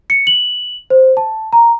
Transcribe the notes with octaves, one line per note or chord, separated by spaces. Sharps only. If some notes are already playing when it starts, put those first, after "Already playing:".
C#7
F#7
C5
A5
A#5